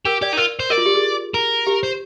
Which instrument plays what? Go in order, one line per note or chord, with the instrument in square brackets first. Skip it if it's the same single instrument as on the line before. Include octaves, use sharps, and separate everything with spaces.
[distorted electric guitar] G4 [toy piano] A#4
[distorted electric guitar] G4 [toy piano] D5
[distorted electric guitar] D#4
[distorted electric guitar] F4 [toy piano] A#4
[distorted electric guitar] C5
[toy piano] A#4 [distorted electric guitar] D5
[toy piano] F4
G4
G#4
[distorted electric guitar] A#4
[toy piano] G4
[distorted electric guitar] C5